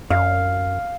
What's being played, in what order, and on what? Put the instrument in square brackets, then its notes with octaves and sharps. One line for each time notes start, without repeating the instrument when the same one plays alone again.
[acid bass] F#2 [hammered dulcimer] F5